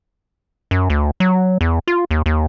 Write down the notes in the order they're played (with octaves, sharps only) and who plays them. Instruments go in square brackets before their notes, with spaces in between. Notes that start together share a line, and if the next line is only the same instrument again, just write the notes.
[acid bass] F#2
D2
F#3
E2
F4
D#2
D#2